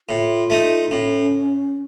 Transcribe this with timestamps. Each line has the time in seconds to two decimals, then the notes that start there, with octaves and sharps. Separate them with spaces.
0.09 A2 F4
0.50 A3 D#4
0.87 D#4
0.91 A2 C#4